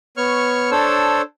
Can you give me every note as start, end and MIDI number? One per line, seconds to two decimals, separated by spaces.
0.17 0.71 59
0.17 0.71 73
0.17 0.71 85
0.17 0.71 89
0.71 1.22 62
0.71 1.22 69
0.71 1.22 72
0.71 1.22 73
0.71 1.22 88